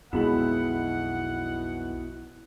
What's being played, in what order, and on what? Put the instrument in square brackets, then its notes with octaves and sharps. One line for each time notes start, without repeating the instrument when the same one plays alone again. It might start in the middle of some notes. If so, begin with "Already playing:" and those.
[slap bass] B1 F2 [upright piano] B2 G#3 [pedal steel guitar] E4 B5 [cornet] F#5